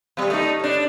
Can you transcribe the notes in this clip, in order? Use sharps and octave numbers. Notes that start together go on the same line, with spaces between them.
B2 G3
A3 D#4
A2 D4